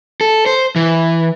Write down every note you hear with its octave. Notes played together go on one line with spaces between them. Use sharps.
A4
C5
E3